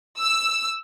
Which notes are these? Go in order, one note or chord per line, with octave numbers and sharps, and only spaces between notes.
E6